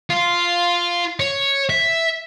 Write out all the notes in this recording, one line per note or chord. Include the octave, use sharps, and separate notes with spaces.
F4
C#5
E5